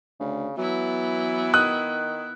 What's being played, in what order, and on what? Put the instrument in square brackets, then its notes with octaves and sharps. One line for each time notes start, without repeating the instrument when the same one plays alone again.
[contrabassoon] D2 [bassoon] C#3
[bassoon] E3 [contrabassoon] F#3 [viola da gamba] B3 E4
[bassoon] D#3 [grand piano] D#6 F#6